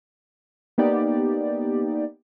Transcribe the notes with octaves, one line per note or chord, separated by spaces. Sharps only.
A#3 B3 D#4 G4 D5